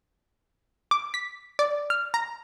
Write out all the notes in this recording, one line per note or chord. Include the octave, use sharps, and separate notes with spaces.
D6
B6
D5
F6
A#5